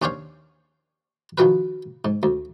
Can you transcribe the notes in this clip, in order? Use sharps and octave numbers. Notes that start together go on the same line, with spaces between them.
D#2 C#4 D4 C5 C#5 F5
D#3 F3 F#3 A#4 B4
G#2
D2